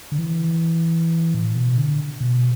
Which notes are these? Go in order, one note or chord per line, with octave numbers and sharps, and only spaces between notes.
D3
E3
A2
B2
D3
B2